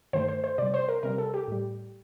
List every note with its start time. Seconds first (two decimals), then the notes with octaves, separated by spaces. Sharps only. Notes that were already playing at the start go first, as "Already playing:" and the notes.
0.13 G2 D#3 A3 C5
0.28 C5
0.44 C5
0.58 C3 G3 D5
0.74 C5
0.89 A#4
1.03 C3 G3 A#4
1.18 A4
1.34 G4
1.48 A2 G3